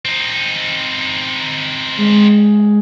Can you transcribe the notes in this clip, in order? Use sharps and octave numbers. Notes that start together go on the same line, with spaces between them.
C4 D#4
G#3